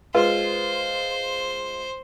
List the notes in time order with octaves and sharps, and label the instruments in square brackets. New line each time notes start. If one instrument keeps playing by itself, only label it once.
[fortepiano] G#3 F4 [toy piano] B4 [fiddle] C5